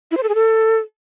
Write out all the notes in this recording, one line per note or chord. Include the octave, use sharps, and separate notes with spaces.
E4
C5
A4
G#4
A4